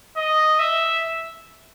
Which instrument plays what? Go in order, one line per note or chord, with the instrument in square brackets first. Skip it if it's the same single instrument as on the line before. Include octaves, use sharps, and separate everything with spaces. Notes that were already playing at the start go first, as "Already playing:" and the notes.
[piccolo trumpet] D#5
E5